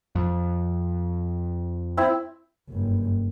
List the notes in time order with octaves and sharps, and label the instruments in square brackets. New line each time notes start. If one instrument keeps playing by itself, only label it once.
[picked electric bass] F2
[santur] C4 E4
[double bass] F#1 G2